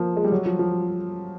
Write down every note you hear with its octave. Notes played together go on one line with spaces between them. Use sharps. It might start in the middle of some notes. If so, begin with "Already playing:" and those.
Already playing: F3 A#3
G#3
G3
F#3
F3
F3